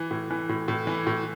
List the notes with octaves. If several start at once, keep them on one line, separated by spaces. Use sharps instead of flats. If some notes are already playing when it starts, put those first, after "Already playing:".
Already playing: E3
A2
E3
A2
A2
E3
A2